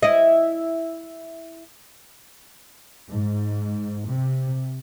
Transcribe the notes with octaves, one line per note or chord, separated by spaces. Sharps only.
E4 D#5
G#2
C3